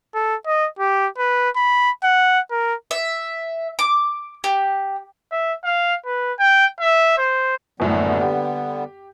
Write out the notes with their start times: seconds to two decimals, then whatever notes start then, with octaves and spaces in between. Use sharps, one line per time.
0.14 A4
0.46 D#5
0.79 G4
1.18 B4
1.56 B5
2.04 F#5
2.51 A#4
2.91 E5
3.79 D6
4.44 G4
5.31 E5
5.64 F5
6.06 B4
6.39 G5
6.80 E5
7.18 C5
7.80 F#1 F#2 A2 D3 G3 B3
8.21 G4